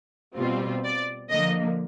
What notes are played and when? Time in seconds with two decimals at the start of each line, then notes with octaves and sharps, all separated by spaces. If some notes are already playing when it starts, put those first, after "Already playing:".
0.36 B2 G3 C4 F4
0.84 D5
1.30 D3 F3 A#3 D#5